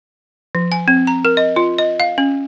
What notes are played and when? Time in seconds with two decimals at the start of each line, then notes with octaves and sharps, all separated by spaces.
0.55 F3
0.72 G#5
0.88 C4
1.07 A#5
1.25 A#4
1.37 D#5
1.56 F4
1.78 D#5
2.00 F5
2.18 C#4